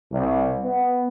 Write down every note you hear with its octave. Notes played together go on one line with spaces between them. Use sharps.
C2
B3